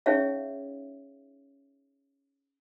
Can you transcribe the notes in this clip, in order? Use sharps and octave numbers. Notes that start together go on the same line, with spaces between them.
C#4 D#4 G#4 C#5 E5 F5